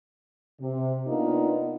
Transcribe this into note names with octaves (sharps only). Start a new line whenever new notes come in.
C3
A#3 B3 D4 D#4 F4 A#4